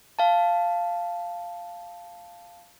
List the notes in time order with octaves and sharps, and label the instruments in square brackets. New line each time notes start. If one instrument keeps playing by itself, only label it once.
[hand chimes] F5 A5